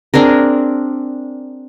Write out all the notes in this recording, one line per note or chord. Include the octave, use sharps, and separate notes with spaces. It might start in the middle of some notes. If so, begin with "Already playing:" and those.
C4 D4 G#4 A#4